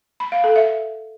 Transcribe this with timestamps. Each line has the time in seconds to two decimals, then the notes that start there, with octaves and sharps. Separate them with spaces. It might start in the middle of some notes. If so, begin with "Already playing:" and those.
0.20 B5
0.32 F5
0.44 A4
0.56 E5